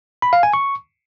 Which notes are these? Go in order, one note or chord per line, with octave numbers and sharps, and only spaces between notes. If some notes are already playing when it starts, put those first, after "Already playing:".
B5
F5
G#5
C#6